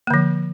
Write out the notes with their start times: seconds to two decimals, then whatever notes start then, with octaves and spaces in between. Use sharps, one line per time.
0.07 A#3
0.10 D3
0.14 F3